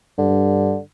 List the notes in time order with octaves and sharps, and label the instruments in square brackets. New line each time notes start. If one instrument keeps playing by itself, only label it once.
[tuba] G2 [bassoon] D3